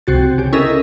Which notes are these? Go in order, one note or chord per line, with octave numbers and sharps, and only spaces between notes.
C2 C3 F#4 A6
C#3 G4
C#4 E4 A4 A#4 D#5